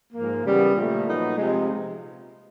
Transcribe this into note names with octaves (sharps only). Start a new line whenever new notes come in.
G#2 F3 A#3
C#3 E3 G3 B3
A#2 F3 A3
A#2 F#3 B3 D#4
C3 F3 G#3